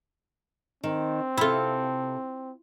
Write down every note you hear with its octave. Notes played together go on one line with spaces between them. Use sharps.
D#3 C4
C3 E4 F4 A4